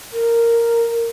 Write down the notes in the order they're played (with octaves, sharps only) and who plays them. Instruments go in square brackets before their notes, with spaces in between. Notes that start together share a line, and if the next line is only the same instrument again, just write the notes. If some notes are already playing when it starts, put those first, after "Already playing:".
[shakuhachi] A#4